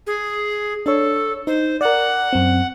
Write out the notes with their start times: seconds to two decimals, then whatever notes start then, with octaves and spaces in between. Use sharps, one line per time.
0.07 G#4
0.86 D4 A4 C#5
1.47 D#4 C5
1.81 A#4 D5 F#5
2.33 F#2 C4